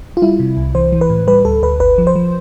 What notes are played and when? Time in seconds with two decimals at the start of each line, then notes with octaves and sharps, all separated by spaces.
0.17 F4
0.22 G3 E4
0.40 C3
0.57 C2
0.75 E3 C5
0.92 E3
1.01 B4
1.10 A2
1.27 G3 B4
1.45 D2 A4
1.63 D2 B4
1.80 G1 B4
1.98 F3
2.07 C5
2.16 F3